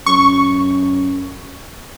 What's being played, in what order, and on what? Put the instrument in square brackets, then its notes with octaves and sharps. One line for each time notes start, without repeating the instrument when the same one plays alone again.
[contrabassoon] F#2 [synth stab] C#6